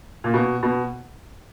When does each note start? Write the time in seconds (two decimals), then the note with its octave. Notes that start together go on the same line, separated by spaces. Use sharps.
0.24 A#2
0.34 B2
0.63 B2